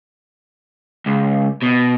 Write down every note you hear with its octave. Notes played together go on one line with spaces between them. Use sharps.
C#2
B2